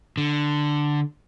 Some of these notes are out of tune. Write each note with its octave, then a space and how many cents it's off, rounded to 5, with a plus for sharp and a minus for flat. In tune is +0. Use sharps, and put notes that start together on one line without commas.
D3 +5